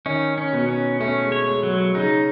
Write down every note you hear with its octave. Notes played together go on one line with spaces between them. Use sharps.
D#3 C#4 D#4
C#4
B2 B3
C#4
A3 C#4
G#3
C#5
G#3
F#3
G#3
C#3 C#4 D#4